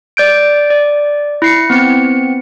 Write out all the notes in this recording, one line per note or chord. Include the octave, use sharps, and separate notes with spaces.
D5 G6 D7
D5
E4 C7 C#7
B3 C4 C#7